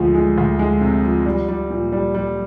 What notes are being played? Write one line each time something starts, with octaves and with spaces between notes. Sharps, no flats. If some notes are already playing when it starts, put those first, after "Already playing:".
Already playing: D2 F3 G#3
G#3
D2
G#3
C3
F3
G3
G3
A#2
G3
G3